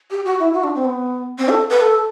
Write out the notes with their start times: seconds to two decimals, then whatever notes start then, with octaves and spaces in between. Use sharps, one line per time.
0.11 G4
0.25 F#4
0.39 E4
0.54 F#4
0.64 D4
0.75 C4
0.85 B3
1.38 C4
1.49 A4
1.70 B4
1.81 A4